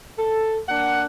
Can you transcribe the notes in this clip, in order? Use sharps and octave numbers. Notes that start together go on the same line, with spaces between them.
A4
A#3 D4 F#5